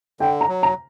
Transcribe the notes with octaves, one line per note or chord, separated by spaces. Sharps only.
D3 G5
A#5
F#3
A#5